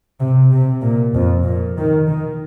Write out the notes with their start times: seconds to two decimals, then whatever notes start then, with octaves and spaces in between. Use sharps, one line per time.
0.21 C3
0.52 C3
0.83 A#2
1.15 F2
1.45 A#2
1.77 D#3
2.08 D#3